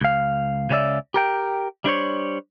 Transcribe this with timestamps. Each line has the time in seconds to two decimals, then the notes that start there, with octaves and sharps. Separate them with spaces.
0.01 C#2 F5
0.70 C#2 C#3 C#4 F#4 D5 E5
1.14 G4 A#4 G5
1.84 G3 D4 C5 C#5